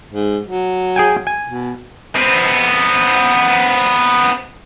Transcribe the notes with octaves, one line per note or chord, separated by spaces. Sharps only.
G#2
F#3
G#4 G5 G#5
G#5
B2
B3 C4